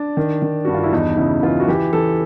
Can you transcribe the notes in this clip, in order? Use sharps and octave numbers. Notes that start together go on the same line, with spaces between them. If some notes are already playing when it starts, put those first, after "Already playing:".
Already playing: D4
D#3
D#3
G2 F#4
F4
E4
E2 D#4
D#4
C#3 E4
E3 F4
F#4
E3 G4
E3 A4